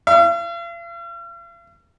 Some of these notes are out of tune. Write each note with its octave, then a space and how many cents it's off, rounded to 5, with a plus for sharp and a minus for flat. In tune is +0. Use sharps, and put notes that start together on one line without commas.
F5 -45